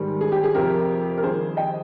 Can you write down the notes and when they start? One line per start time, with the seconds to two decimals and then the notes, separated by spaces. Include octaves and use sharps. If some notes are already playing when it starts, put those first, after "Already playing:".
Already playing: G#2 D#3 G3
0.21 G#4
0.32 G4
0.43 G#4
0.55 F2 C3 F3 G4 A#4
1.18 A#4
1.23 F2 D#3 G3 G#4 C5
1.57 D#5 G5